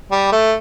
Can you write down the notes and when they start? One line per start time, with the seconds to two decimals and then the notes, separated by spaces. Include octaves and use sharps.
0.11 G3
0.32 A3